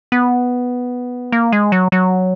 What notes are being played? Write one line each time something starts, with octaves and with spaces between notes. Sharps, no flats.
B3
A#3
G#3
F#3
F#3